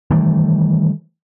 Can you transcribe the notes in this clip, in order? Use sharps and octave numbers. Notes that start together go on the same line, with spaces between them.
D#3 E3 G3 A3